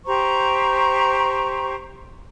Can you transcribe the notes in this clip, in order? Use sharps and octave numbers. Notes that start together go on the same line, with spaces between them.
G4 C5 A#5 C#6